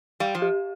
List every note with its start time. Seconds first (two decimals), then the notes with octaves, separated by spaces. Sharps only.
0.20 G3 F5
0.35 F3
0.42 G4